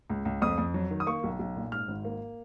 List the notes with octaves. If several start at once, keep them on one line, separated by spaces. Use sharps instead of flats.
C#2
C#2
F2 D#6
F2
F#3
D#3
D#6
A#3 C#6
B1
B1
A#2
G#2 F6
G#1
A#3